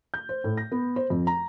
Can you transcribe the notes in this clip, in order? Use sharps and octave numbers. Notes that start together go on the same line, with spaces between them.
G6
C5
A2
A#6
B3
C5
F2
A#5